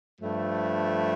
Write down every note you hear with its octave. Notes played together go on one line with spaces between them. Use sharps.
G2 F3 A3